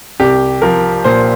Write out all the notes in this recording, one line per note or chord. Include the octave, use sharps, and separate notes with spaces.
C2 G4
F3 A#4
A#2 C5